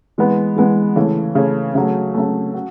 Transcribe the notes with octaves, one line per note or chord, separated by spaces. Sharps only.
E3 G#3 B3
E3 G#3 B3
C#3 E3 A3 C#4
C#3 E3 A3 C#4
C#3 F#3 A3
C#3 F#3 A3
F#4